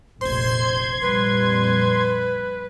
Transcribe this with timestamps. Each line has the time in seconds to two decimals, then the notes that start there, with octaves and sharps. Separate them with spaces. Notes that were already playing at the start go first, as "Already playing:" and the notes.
0.21 F1 A#1 C5 C6 G#6
1.02 F2 A#2 G3 B4